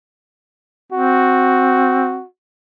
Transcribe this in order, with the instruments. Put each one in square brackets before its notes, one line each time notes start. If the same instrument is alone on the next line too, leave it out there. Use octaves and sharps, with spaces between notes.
[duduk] C4 [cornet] F#4